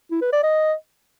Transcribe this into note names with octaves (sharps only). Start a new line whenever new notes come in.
E4
B4
D5
D#5